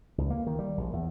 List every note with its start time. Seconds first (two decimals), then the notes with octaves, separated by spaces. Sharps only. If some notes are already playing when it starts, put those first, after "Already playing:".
0.18 C#2
0.30 A#3
0.47 D#3
0.59 G3
0.77 A#1
0.93 E2